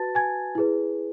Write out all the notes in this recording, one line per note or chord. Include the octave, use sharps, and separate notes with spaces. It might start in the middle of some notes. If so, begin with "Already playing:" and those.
Already playing: F#4 B4 A5 A6
G#5 G#6
E4 G#4 B4